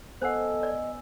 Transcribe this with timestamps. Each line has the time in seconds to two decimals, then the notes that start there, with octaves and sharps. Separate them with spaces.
0.22 B3 A4 C5 D#5 F#5 G#5 E6
0.63 D5